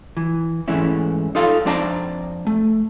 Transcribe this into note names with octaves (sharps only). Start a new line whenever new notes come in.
E3
G#2 E3 G#3 A3 C#4 E4
D#4 F4 A4 F5 C6
F2 C4 D4 D5 A5 A#5
A3